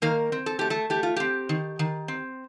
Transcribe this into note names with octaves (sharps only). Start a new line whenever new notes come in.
D#3 A#3 A#4
C4
A4
A3 G4
A3 A4
A3 G4
F4
C4 G4
D#3
D#3
C4